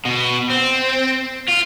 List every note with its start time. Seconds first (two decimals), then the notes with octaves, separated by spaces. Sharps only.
0.05 B2
0.50 C4
1.48 F4